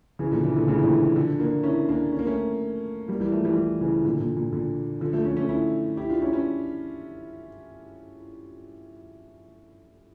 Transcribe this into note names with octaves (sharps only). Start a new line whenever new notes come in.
C#3 E3
A#2 D3
C#3 E3
A#2 D3
A2 C#3
E3
A#2 D3
D3 F3
A#3 D4
C#4 E4
A#3 D4
C#4
A#3
A3 C#4
G3 A#3
E3 G3
F3 A3
E3 G3
E3 G3
C#3 E3
A#2 D3
A#2
A#2
A#2 D3
D3 F3
F3 A3
A3 C#4
A3 C#4
C#4 E4
E4 G4
D4 F4
C#4 E4
C#4 E4